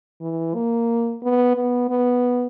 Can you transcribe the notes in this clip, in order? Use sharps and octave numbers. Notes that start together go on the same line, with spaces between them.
E3
A#3
B3
B3
B3